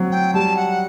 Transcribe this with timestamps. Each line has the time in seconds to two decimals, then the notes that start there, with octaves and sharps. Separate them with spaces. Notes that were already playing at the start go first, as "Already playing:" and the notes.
Already playing: F#3 C4
0.11 G5
0.34 G3 A5
0.56 F#5